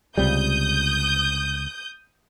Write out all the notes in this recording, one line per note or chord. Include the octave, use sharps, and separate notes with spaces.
C#2 C3 G3 D#6 G6